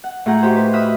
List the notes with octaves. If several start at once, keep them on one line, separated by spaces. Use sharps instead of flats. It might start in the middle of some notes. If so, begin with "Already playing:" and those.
F#5
A2 F4 G#4 F#5 A#5 G6
D#4 F#4 G4 C5
B4 C5
E5 B5 D#6 F6 F#6